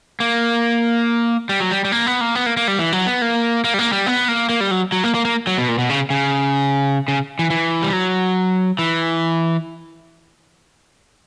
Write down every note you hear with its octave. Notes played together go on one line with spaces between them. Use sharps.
A#3
G3
F#3
G3
G3
A#3
B3
A#3
B3
A#3
A#3
G3
E3
F#3
B3
A#3
A#3
G3
A#3
G3
B3
A#3
A#3
G3
F#3
F#3
A#3
A#3
A#3
F#3
B2
A#2
B2
C#3
C#3
C#3
E3
E3
G3
F#3
E3